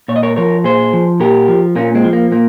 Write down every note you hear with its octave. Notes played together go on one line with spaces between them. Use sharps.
A#2 C#5
D#5
A#4 C#5
F3 A#4 C#5
A#2 G#4 C5
F3
A#2 G4 A#4
F3
A#2 A#3 C#4
G#3 C4
F3
A#3
A#2 A#3